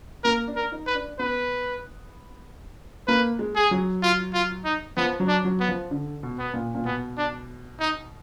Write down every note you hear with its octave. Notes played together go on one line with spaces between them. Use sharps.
A#3 A#4
D4
A#4
D#4
B4
D4
B3 B4
A#3 B4
G#3
G#4
F#3
F4
F4
D#4
F3 B3
F#3
D4
F#3
B3
F3
D3
B2
B3
A#2
A#2
B2 B3
D4
D#4